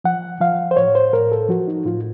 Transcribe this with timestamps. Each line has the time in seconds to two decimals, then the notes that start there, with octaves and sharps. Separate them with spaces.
0.04 F3 F#5
0.40 F3 F5
0.71 C5
0.77 A2 C#5
0.95 C5
1.13 A2 A#4
1.32 A4
1.49 F3 F#4
1.68 D#4
1.85 A2 F4